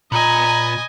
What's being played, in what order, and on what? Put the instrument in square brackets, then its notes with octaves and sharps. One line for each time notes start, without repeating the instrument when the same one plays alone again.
[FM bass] A#2 [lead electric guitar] B3 B4 [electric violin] D#5 G#5 [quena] A#5